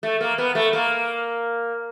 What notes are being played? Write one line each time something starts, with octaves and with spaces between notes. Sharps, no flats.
A3
A#3
B3
A3
A#3